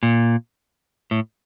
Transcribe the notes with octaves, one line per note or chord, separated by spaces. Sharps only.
A#2
A2